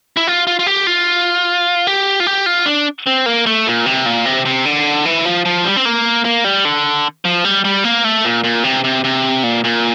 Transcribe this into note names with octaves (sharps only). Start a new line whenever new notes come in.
E4
F4
F4
F4
G4
F4
G4
F4
G4
F4
D4
C4
A#3
A3
A#2
C3
A#2
C3
C3
D3
E3
F3
F3
G3
C4
A#3
A#3
G3
D3
F3
G3
G3
A#3
A3
A#2
A#2
C3
C3
C3
A#2
A#2